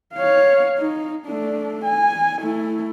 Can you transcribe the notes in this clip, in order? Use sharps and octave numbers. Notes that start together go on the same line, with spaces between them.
C#5 F5
D#4
A3 D4
G#5
A3 E4